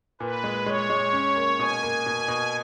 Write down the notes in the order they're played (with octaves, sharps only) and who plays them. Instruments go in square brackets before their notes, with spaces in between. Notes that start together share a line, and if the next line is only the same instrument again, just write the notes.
[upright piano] A#2 [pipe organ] B4
[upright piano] G#3
[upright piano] G#3 [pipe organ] C#5
[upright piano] G#3
C#4
A#3
[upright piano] B2 [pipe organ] G#5
[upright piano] A#3
B2
B2